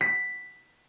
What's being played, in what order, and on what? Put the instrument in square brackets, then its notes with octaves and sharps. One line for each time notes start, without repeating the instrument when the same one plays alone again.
[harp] B6